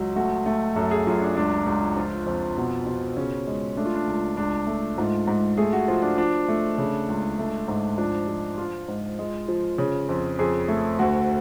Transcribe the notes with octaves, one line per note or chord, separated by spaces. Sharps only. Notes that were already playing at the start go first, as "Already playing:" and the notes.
Already playing: C#2 F#3
A3 F#4
A3
F#2 A4
G#4
F#2 F4
D4
C#2 D4
C#2
F3 F4
F2
B2
B2
C#3 C#4
G#3
A3 D4
F4
D4
C#2
C#2 D4
A3
G#2 F4
G#2
A3 G#4
F#4
F3 F4
D4
F3 D4
A3
C#3
C#2
A3
G#2
F3 D4
F3
F3 F4
G#2
G#3
F3
C#3
F2
F2 G#4
A3
D2 F#4